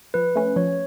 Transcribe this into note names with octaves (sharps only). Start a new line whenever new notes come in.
F3 B4
A3 C#4
F3 C#5